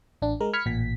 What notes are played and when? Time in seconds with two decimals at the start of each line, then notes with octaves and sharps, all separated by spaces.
0.22 A1 D4
0.41 G#3 A#4
0.53 B5 F6 G#6 B6 C#7
0.66 A1 A#2 B6